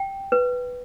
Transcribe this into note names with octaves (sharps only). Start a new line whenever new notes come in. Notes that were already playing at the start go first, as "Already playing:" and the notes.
Already playing: G5
B4